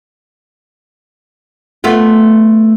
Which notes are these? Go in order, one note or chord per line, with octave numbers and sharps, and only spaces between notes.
A3 B3 F4